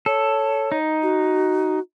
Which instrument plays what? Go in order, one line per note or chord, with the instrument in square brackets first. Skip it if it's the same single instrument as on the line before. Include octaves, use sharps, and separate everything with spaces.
[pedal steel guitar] A4 [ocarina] C#5
[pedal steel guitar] D#4
[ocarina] F#4